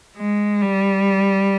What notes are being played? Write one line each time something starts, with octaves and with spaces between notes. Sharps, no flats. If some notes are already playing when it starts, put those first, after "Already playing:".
G#3
G3